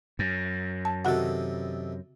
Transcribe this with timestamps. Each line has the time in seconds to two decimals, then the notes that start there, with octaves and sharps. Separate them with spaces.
0.19 F#2
0.85 A5
1.05 C3 D#3 F#4 A4 F#5